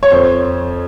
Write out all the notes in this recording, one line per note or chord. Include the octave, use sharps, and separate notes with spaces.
C#5
F2 C5